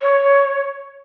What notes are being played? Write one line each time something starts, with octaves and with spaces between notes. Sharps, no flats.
C#5